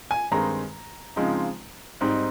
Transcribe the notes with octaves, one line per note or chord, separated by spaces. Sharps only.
G#5
G2 D#3 G#3 C4 D#4 A#5
C#3 F3 G#3 C4 D#4
G#2 G3 C4 D#4